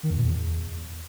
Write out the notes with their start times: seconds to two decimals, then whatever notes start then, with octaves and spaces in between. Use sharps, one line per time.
0.03 D#3
0.10 E2
0.17 A#2
0.24 E2